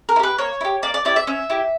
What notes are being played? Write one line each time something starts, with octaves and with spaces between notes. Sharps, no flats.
A#4
E4
G4 B4
A#3 C#5
E4
G4
A#3 D5
D5
E4 G4 D5
E5
C#4 E5
E4 G4